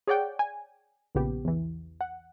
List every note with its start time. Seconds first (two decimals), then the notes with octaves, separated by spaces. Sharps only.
0.07 G#4 C#5 D5 F#5 G5
0.39 G#5
1.15 A#1 C#3 B3 G4
1.45 E2 E3
2.01 F#5